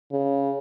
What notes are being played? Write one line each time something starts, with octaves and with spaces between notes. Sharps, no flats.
C#3